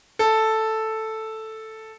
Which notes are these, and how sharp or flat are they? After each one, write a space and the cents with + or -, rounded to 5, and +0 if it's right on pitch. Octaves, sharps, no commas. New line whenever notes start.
A4 +0